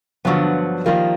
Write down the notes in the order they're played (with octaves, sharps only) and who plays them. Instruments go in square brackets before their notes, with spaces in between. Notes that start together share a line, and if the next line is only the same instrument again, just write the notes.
[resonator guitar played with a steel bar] G2 D3 F#3 B3 [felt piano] F3 F4
[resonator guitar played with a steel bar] D#3 G3 A#3 [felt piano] F3 F4